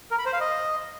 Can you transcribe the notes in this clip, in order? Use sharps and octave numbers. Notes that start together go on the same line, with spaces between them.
A#4
B5
C5
F5
D#5